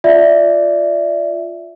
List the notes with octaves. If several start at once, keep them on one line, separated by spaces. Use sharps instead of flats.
F4 D5 E5